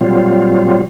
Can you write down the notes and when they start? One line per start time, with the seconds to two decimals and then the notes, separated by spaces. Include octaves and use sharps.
0.01 A#2 F#3 G3 C4 F4